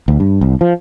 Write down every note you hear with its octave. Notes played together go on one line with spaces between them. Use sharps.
D2
G2
C2
F3